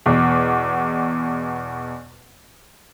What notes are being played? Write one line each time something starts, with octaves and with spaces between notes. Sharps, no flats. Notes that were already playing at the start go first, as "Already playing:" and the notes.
E2 B2